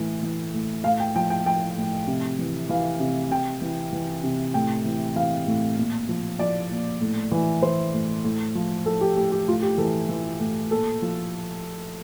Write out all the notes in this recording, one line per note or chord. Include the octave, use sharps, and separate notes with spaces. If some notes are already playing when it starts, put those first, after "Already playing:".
Already playing: A2 E3
E3
A2
A2 F5
G5
F3 G5
G5
F3 G5
A2
C3
E3
E3 F5
C3
C3 G5
E3
E3
C3
A2 G5
E3
E3 F5
A2
A#2
F3
F3 D5
A#2
A2
E3
E3 C5
A2
A2
F3
F3 A4
G4
A2 G4
G4
A2 F4
G4
E3 A4
E3
A2
A#2 A4
F3